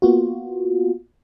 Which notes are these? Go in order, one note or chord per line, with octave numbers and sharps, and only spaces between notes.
A#3 B3 F4 F#4